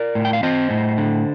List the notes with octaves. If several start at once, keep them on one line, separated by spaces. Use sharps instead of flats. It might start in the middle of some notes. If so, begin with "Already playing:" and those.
Already playing: A#4 D5
A2
G5
F5
C4 C5 D#5
A2
D3